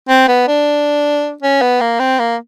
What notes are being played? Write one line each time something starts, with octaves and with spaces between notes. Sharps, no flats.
C4
B3
D4
C#4
B3
A#3
C4
A#3